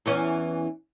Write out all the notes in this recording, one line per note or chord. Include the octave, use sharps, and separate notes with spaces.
E2 E3 C#4